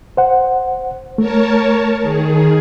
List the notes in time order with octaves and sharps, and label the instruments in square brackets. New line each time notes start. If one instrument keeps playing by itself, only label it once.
[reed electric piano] C5 F#5
[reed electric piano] A3 [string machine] A#4 C#5 A5
[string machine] D#3 G#4